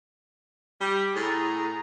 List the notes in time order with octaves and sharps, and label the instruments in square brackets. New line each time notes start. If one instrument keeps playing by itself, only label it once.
[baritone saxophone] G3 [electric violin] G4
[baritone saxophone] A2 [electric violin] G#4 A#5